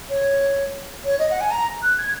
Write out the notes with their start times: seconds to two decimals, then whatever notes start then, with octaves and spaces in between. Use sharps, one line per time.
0.09 C#5
1.04 C#5
1.19 D#5
1.31 F#5
1.41 G#5
1.51 A#5
1.83 F#6
1.98 G#6